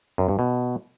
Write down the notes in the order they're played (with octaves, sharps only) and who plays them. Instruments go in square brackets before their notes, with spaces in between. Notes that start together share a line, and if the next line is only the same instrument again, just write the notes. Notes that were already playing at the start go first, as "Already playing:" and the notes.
[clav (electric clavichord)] F#2
G2
B2